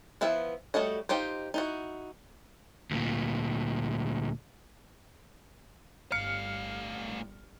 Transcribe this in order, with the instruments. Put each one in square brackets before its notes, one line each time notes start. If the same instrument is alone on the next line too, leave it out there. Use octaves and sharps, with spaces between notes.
[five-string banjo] F3 B3 E4 E5
G3 A3 F#4 C#5 D#5
D#4 F4 G4 C5
D#4 E4 F#4
[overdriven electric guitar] D2 A#2
[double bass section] G1 G3 [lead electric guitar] A2 F5 [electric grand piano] F6 [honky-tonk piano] C#7